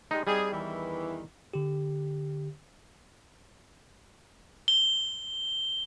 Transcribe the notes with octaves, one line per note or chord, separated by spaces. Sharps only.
G3 G#3 D#4
G3 C4 D#4 G#4
E2 D#3 E3
D3 G4
G7